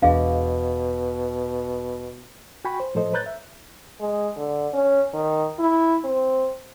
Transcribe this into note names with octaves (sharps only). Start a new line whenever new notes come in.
E1 E2 B2 D4 G#4 D#5 F5
F#4 G5 G#5 B5 C#6
C5
A2 F3 A4 C5 D#5
B4 C#5 A#5 F#6 G6 A6
E5
G#3
D3
C#4
D#3
E4
C4